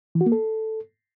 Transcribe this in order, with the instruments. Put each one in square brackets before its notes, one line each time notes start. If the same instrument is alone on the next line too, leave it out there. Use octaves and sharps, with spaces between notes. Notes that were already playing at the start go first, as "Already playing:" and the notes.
[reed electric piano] E3
F#4
A#3
A4